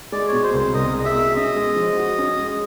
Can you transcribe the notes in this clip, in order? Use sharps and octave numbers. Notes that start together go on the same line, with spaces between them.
G#3 D5
B2 C#5
C5
C2
C5
C2 D#5
G#3 D#5
E5
B2
C#4 D#5
G#3
F3
F#4
C#4
G#3